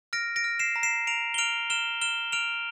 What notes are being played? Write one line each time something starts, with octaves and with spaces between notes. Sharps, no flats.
F6 A#6 D7
A#6 D7
F6
C7 E7
A#5
C7 E7
A#5 D7 F7
G7
F6 D7 F7
F6 E7 G7
F6 E7 G7
F6 D7 F7